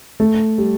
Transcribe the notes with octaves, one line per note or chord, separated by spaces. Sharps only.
A3
G3